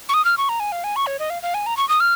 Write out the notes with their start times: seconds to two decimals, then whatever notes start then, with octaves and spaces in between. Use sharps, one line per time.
0.09 C#6
0.14 D#6
0.25 F6
0.38 C#6
0.49 A#5
0.60 G#5
0.72 F5
0.84 G#5
0.96 C#6
1.07 C#5
1.19 D#5
1.30 F5
1.43 F5
1.54 G#5
1.66 A#5
1.77 C#6
1.89 D#6
2.00 F6